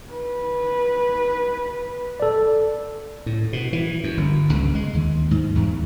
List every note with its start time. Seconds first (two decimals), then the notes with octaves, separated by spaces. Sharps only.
0.13 B4
2.20 A4 D5
3.26 A2
3.53 B2
3.73 E3
4.04 F#2
4.17 G1
4.53 C#2
4.75 G#3
4.94 D#2
5.31 G#2
5.55 E2